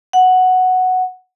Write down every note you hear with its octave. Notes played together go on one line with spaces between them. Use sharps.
F#5